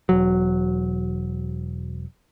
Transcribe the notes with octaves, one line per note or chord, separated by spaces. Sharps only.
E1 F#3